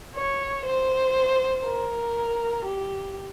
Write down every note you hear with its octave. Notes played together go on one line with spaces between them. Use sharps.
C#5
C5
A#4
G4